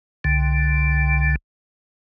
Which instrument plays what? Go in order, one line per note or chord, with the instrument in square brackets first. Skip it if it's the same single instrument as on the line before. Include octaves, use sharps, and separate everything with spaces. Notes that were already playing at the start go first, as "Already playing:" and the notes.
[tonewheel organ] C2 D3